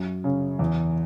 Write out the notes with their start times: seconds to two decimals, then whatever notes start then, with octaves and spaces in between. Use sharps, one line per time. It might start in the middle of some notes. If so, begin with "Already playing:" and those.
Already playing: F#2
0.24 C#3
0.59 E2